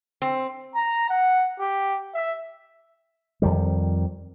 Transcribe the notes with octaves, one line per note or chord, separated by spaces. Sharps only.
C4
A#5
F#5
G4
E5
F2 D#3 G3